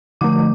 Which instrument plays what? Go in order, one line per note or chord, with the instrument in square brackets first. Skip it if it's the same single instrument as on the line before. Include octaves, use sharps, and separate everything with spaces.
[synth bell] D3 F3 A3 D6